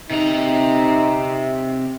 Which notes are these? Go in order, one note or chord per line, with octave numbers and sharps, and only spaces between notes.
C3 D#4 A#5